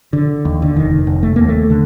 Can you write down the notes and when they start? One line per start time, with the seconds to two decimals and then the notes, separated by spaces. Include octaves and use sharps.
0.13 D3
0.45 D#2
0.62 D3
0.76 F1 D#3
1.07 F1
1.23 A3
1.36 D#2 A#3
1.48 A3
1.70 D3